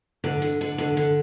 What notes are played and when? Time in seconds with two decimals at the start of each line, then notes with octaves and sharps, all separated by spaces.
0.24 D3
0.42 D3
0.61 D3
0.78 D3
0.97 D3